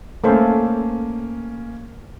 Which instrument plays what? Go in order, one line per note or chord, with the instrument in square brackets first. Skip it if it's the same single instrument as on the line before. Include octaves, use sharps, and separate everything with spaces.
[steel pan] A3 A4 C5 [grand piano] A#3 C#4